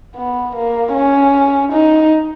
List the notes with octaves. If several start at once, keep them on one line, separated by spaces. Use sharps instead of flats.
B3
A#3
C#4
D#4